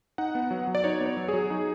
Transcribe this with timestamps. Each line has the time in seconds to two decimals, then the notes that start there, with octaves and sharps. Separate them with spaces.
0.18 D#4 F#5
0.35 B3
0.51 F#3
0.67 F#3
0.75 D5
0.84 D#4 C#5
1.00 B3
1.06 C#5
1.17 F#3
1.28 G#4
1.33 F#3
1.50 D#4